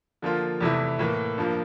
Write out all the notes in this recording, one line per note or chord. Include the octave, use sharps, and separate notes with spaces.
D3 F3 A#3 F4
E2 C3 E3 A3 E4
A2 E3 A#3
G2 F3 A#3